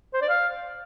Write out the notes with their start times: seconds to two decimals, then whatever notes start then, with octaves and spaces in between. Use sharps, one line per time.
0.14 C5
0.21 D5
0.29 F5